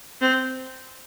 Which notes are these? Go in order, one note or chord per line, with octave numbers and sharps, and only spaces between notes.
C4